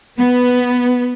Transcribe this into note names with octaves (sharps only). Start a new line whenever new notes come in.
B3